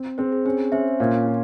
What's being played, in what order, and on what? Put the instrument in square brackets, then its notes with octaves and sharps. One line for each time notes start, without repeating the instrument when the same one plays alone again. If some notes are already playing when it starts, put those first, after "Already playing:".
Already playing: [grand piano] C4
[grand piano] C4 [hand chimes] G#4 C5
[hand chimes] G#4
[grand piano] C#4 [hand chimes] G#4 C5
[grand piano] C#4 [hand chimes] C5 E5
[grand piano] A#2 [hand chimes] C#5 F5
[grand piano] F4